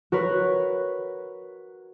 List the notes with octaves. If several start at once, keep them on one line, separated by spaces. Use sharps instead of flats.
F#4 A#4 B4 C#5